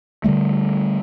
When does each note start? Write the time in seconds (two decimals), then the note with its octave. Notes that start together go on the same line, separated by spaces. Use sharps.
0.24 D3 F3 G3 A3